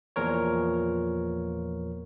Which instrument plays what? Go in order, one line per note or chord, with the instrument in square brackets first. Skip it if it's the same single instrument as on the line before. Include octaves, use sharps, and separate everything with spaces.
[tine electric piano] E2 A#2 F3 A#4 C#5